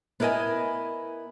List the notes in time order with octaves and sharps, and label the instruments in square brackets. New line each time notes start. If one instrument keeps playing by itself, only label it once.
[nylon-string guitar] B3 E4 A#4 D5 D#5 G#5